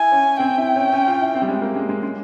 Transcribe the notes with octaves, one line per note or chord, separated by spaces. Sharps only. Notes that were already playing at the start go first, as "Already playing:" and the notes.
Already playing: E4 G#5
C#4
C4 G5
E4
C#4
C#4
F4
E4
C4
G3
G#3
A#3
G#3
G#3
G#3